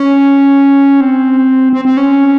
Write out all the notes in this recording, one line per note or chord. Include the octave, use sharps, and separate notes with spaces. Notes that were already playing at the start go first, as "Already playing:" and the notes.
Already playing: C#4
C4
C4
C4
C#4